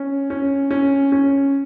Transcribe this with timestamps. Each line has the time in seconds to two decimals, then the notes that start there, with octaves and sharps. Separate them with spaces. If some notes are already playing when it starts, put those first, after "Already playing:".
Already playing: C#4
0.30 C#4
0.71 C#4
1.12 C#4